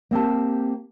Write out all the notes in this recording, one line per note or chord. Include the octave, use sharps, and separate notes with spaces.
A#3 C4 G4 A5